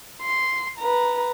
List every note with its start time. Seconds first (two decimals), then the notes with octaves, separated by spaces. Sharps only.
0.21 C6
0.78 B4 A#5